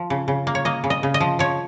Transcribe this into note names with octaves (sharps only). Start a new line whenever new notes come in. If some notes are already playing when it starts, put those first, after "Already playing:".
Already playing: F3
C#3
C#3
A#3
C#5
A#3 D#5
C#3
D#5
C#3
D#5
F3
F3 C#5